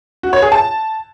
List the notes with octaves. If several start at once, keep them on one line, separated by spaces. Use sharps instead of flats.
F#4
C#5
G#4
A5